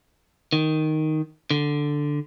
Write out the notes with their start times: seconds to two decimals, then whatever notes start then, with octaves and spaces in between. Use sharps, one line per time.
0.53 D#3
1.51 D3